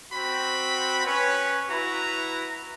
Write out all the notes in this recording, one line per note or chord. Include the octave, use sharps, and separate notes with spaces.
C4 F#4 B5
C#4 B4 C#5
E4 F#4 B4 A#5